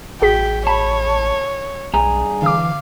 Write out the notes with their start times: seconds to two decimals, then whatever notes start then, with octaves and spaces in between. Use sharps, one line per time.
0.22 A1 F#4 G#4 G5 B6
0.67 C#5 A5 B5
1.93 B1 G2 G#4 A#5
2.42 D3 E3 F5 D6